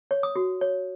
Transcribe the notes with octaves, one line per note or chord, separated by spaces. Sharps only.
C#5
D#6
F#4
C#5